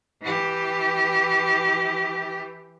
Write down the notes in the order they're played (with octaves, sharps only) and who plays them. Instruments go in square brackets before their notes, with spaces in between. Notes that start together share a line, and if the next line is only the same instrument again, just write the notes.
[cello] E3 G4